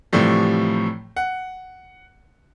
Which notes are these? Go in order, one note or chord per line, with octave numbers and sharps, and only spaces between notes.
A2 C3 E3 F3 G3 A3
F#5